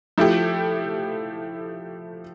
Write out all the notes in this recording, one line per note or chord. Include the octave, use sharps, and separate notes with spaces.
F3 A3 E4 G4